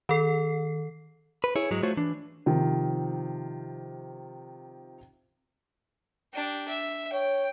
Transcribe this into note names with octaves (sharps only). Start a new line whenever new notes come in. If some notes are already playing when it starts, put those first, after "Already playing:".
D#3 A4 C7
B4
E4 G#4 C#5
G#2 F#3 G#3
A3 F4 F#4 C5 C#5
E3 D4
C3 D#3 F3
D4 G4
E5
C#5 G5